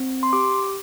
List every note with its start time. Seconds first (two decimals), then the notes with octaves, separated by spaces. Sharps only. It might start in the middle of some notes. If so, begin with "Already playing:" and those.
Already playing: C4
0.23 C6
0.33 G4 D6